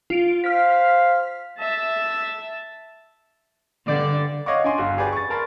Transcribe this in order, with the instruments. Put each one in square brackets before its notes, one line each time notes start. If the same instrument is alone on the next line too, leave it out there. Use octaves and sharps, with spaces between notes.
[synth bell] F4 D7
[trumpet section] C5 F5 [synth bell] F6 B6
[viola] E5 A5
[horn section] G2 D5 [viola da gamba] D3
[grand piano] C#5 D#5 F5 F#5 C#6 D6
D4 G#5 C6
G1 F#4 F5
G4 G#4 B4 D5
C#6 A6
A#4 A5 B5 C6 A6